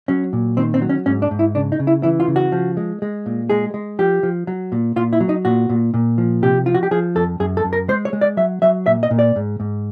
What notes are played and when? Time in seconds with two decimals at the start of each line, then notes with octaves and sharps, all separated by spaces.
0.08 F#3 C#4
0.33 A#2
0.57 D#3 C4
0.74 C4
0.82 F#3
0.89 C#4
1.06 G#2 C#4
1.22 D4
1.31 G#2
1.39 E4
1.55 C#3 D4
1.72 D#4
1.79 C#3
1.87 E4
2.03 E3 E4
2.20 F4
2.28 C#3
2.36 F#4
2.52 F3
2.77 G#3
3.02 G#3
3.26 A#2
3.50 G#3 G#4
3.74 G#3
3.99 F3 G4
4.23 F3
4.47 F#3
4.72 A#2
4.96 A#2 F4
5.13 E4
5.20 F#3
5.29 D#4
5.45 A#2 F#4
5.69 A#2
5.94 A#2
6.18 F3
6.42 C3 G4
6.66 F3 F4
6.74 F#4
6.83 G4
6.91 F3 G#4
7.15 F2 A4
7.40 F#2 G#4
7.57 A4
7.64 F#2
7.73 A#4
7.88 G#3 C5
8.05 C#5
8.13 G#3
8.21 D5
8.37 F#3 E5
8.62 F#3 E5
8.86 A#2 E5
9.03 D#5
9.11 A#2
9.19 D5
9.36 G#2
9.60 G#2